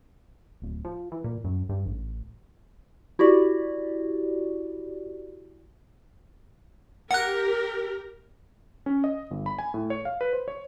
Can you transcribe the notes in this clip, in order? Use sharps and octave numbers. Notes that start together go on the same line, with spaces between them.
D1
F3
E3
A#2
F#2
G2
A1
E4 F#4 G4 D5
G4 A#4 F#5 F#6
C#4
D#5
G1
B5
G#5
A2
C#5
F5
B4
C5
C#5